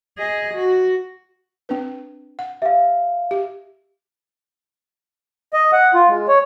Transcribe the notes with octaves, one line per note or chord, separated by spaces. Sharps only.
G#4 D#5
F#4
C4 D4 B4
F#5
G4 E5 F5
G4
D#5
F#5
F4
G#3
C#5